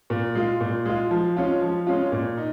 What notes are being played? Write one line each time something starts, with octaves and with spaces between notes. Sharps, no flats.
A#2
G#3 F4
A#2
G#3 F4
F3
G#3 C#4 F4
F3
G#3 C#4 F4
A#2
D#4